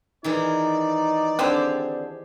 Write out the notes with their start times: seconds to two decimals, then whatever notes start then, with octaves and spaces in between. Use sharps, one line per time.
0.24 D#3 E3 G#3 D#4 D5
1.39 D3 C4 G4 G#4 C5